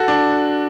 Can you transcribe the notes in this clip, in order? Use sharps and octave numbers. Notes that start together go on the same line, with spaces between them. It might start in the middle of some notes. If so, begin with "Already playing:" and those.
Already playing: F#4 A4
D4